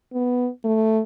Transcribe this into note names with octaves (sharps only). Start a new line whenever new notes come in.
B3
A3